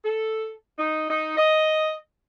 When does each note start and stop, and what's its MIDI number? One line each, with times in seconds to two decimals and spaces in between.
0.04 0.51 69
0.79 1.10 63
1.10 1.36 63
1.37 1.94 75